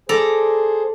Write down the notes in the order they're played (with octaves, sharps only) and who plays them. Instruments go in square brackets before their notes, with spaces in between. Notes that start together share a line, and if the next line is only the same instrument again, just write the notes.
[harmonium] G#4 C5 [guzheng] A4 D5 A#5